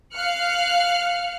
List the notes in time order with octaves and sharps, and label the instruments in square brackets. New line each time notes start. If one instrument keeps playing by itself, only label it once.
[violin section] F5 F6 F#6 C#7